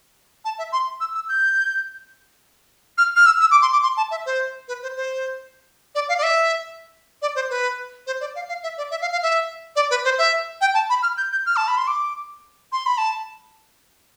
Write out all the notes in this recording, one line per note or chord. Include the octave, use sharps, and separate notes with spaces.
A5
E5
C6
E6
E6
G6
F6
F6
E6
E6
D6
C6
D6
C6
A5
E5
C5
B4
C5
C5
D5
F5
D5
E5
D5
C5
B4
C5
D5
F5
F5
E5
D5
E5
F5
F5
E5
D5
B4
C5
E5
G5
A5
B5
F6
G6
G6
F6
A5
B5
C6
D6
C6
B5
A5